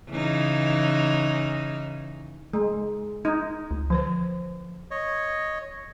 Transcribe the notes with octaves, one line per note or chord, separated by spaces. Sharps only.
C#3 E3 D#4
G#3
D#4
C#2
D3 F3 B4 C5
C#5 D#5